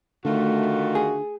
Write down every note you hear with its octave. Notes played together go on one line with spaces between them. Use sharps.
D3 D#3 A3 F4 F#4
G#4